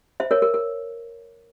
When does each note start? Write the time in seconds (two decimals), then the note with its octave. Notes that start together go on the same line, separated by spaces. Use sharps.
0.20 C5 E5
0.31 A#4 C#5
0.42 A#4
0.54 A#4